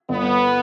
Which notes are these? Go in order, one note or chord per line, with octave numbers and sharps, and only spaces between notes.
G1 B3